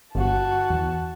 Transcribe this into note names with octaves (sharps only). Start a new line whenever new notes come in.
G1 F#4 A5
E2